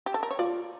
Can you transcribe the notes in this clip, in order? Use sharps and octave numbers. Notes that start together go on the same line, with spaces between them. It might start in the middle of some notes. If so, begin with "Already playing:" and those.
G4
A4
A#4
C#5
F4 D5